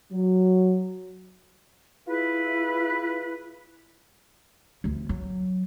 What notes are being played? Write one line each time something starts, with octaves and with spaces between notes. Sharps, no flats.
F#3
E4 F4 G#4 B4
D2 A3
F#3